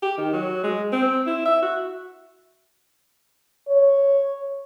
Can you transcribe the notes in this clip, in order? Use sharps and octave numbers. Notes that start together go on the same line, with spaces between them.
G4
D#3
F#3
G#3
C4
E4
E5
F#4
C#5